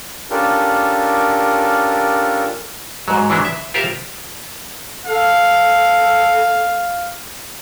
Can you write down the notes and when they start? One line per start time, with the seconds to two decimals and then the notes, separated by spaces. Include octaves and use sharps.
0.30 C#4 D4 F4 G4 A4 A#4
3.08 G#2 F#3
3.30 E3 F#3 G#3 D4 E4
3.45 E5
3.74 F4 G4 A#4 C5 E5 F5
5.06 A4 F5